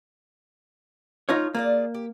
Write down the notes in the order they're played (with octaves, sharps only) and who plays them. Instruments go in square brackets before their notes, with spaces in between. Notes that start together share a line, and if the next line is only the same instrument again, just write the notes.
[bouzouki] A3 [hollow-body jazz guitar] D#4 F4 C#5
[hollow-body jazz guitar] A#3 [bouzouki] F4 G#4 D5
[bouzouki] G4